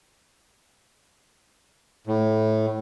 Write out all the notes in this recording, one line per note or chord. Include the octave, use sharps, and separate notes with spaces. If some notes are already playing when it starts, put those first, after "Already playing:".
A2